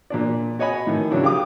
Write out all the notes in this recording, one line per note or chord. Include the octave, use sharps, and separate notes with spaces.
A#2 D4 D5
F#4 C#5 D#5 G#5 B5
A2 D#3
C#3 F#3 D4 E4
G4 F5 D6 D#6